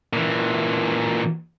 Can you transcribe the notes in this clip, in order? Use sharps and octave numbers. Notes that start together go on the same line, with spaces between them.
A#2 E3